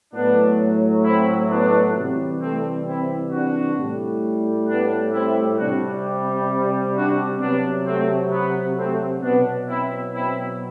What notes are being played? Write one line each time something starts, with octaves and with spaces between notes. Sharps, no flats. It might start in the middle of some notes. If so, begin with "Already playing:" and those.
A2 F#3 B3 D4
C4 E4
B3 D4
C3 E3 G3
A3 C4
C4 E4
D4 F#4
A2 G3
B3 D4
C4 E4
C3 G3 D4 F#4
D4 F#4
C3 F#3 B3 D4
A3 C4
B3
A3 C4
B2 F#3 B3 D4
C4 E4
C4 E4